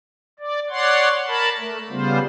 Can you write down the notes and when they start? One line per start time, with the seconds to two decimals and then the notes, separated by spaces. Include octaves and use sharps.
0.39 D5
0.70 C#5 D5 F#5 C6
1.27 A#4 A5 B5
1.59 A3
1.90 C#3 G3 B3 F4 C5